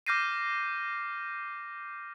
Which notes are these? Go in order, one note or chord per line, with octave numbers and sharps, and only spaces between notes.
D6 F6 G6 A#6 C7 D#7